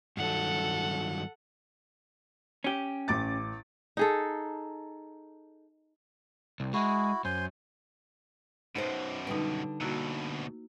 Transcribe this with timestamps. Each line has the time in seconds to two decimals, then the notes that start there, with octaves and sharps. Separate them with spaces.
0.17 G2 D#3 F#3 A4 F#5
2.64 C#4 G4
3.08 A1 D6 A6
3.97 D#4 G#4 A4
6.60 C2
6.74 G#3 E4 F#4
7.25 F#2 C5 G#5 C6
8.75 F#2 B2 D#4 B4 C5
9.27 D3 G3 D#4 B4 G5
9.81 D2 B2 A#3 E4 F#4